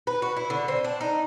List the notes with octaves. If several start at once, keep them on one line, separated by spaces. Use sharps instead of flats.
B4
F#4
E4
D3
C4
D4
D#4